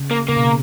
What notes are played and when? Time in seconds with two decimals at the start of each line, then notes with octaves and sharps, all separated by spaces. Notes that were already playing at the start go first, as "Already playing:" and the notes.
Already playing: C#3
0.11 A#3
0.28 C#3 A#3
0.36 B2
0.45 C#3